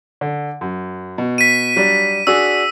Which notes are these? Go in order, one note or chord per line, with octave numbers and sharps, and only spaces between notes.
D3
F#2
B2
B6 D#7
F#3 G3 D4
D4 F#4 G#4 E6